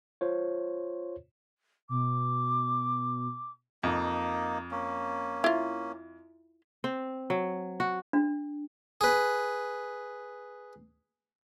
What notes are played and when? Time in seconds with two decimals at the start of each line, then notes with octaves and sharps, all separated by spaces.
0.21 F4 C5 C#5
1.89 B2 D6
3.83 F2 A#3 D#4
4.71 A#3 C#4
5.44 E4 F4
6.84 C4
7.30 F#3
7.80 F#4
8.13 D4
9.01 G#4 B4